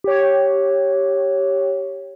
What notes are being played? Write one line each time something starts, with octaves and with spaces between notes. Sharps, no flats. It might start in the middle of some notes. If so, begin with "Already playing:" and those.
G4 C#5